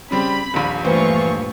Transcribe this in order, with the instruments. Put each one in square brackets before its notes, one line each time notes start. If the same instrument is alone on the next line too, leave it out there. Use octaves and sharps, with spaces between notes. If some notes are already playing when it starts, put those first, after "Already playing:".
[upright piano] C#3 G3 C4 [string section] B5
[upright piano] D#1 A#1
[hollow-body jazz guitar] G2 A#2 C4 [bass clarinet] E3 [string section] A3 F4 C#6